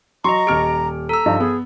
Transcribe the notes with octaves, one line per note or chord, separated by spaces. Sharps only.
F#3 D#5 A#5 C6 C#6
D#1 G4 F6 D7
A4 A#5 E6
G2 F3 D#4
B3 G#4